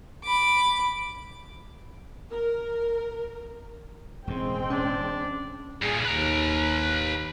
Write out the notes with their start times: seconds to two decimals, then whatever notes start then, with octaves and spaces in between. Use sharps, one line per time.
0.24 B5 D6
2.31 A#4
4.27 E1 F#2 A2 G#3 C4 G5
4.70 C#4 D4
5.83 G2 A#2 G#4
6.05 D#2 B4 A#5